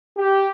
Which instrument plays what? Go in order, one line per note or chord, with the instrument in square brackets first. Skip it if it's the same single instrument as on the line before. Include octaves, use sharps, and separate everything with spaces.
[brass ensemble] G4